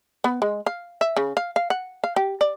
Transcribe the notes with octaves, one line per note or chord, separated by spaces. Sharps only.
B3
G#3
F5
E5
C#3
F5
F5
F#5
F5
G4
D5